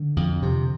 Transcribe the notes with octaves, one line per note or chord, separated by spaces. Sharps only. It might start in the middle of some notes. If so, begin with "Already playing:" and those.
Already playing: D3
F2
C3